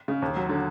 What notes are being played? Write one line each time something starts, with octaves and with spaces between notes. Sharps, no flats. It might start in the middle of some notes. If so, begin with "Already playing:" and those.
C#3
D#2
F#3
D3